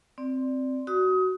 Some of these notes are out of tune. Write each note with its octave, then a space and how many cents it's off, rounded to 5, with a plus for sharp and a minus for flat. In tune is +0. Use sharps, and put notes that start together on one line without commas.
C4 +0 D5 +0
F#4 +15 D#6 +25